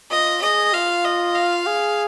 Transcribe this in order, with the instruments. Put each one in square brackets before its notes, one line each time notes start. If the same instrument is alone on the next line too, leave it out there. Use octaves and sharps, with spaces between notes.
[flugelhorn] F4 [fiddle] D#5
[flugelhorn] G#4 [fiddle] D#5
[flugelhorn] F4 [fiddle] F5
[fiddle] D#5
F5
[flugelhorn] G#4